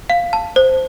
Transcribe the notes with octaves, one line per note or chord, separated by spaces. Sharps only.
F5
A5
C5